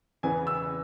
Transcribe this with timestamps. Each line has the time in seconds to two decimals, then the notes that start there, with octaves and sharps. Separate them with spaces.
0.23 E2 C#3 E3 B3 G#5
0.47 E6